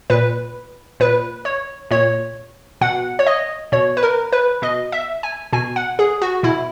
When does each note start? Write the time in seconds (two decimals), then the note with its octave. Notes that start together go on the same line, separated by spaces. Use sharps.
0.10 A#2 B4
1.00 A#2 B4
1.45 C#5
1.91 A#2 C#5
2.81 B2 F#5
3.19 C#5
3.26 D#5
3.72 B2 C#5
3.97 B4
4.03 A#4
4.32 B4
4.62 B2 D#5
4.92 E5
5.23 G#5
5.53 B2 G#5
5.76 F#5
5.99 G#4
6.22 F#4
6.43 B2 E4